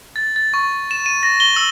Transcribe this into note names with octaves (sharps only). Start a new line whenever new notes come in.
A6
A6
C#6
E7
D#7
A#6
G7
E6